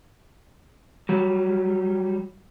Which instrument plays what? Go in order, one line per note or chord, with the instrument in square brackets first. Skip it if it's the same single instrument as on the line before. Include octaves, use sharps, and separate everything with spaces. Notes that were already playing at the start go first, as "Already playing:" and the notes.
[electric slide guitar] F#3 G3